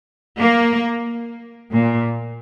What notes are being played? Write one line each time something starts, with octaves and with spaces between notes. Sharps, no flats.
A#3
A#2